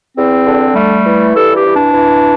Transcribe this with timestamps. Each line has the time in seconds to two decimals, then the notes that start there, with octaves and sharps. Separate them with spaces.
0.16 E2 C4
0.45 D3
0.75 G3 A3
1.05 E3
1.34 G2 A4
1.54 G4
1.65 E3
1.74 D4
1.93 E3